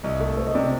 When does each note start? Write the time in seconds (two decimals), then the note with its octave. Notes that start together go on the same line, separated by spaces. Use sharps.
0.03 C2 D#5
0.20 A3
0.37 A3 C5
0.47 D#5
0.54 C3 D5